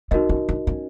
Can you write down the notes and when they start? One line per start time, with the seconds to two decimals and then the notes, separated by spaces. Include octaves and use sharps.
0.11 C4 D#4 F#4 A#4 D#5
0.29 C#4
0.49 D4
0.67 C#4